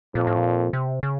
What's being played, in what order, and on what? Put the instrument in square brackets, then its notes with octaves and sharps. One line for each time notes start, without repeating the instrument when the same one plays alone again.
[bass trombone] F2 [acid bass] A#2
[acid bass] A2
A#2
C3
C#3